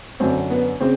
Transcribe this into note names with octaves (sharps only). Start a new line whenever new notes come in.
F#2 D3 C4
B3
C#3 C4